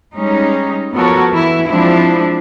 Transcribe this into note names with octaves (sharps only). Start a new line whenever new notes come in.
G3 G#3 C#4 D#4
F3 B3 F#4 A4 A#4 C#5
E3 E4
F3 G#3 C4 D4 E4